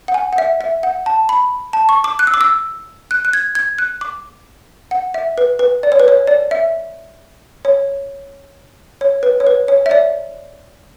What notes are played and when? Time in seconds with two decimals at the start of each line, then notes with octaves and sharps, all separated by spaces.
0.08 F#5
0.14 G#5
0.33 F#5
0.38 E5
0.61 E5
0.83 F#5
1.06 A5
1.29 B5
1.73 A5
1.89 C#6
2.04 D6
2.19 F#6
2.27 E6
2.34 D6
2.41 E6
3.11 F#6
3.25 F#6
3.33 G#6
3.55 G#6
3.79 F#6
4.01 D6
4.91 F#5
5.14 E5
5.38 B4
5.59 B4
5.83 D5
5.92 C#5
6.00 B4
6.08 C#5
6.27 D5
6.51 E5
7.65 C#5
9.01 C#5
9.23 B4
9.40 C#5
9.47 B4
9.68 C#5
9.86 E5
9.91 D5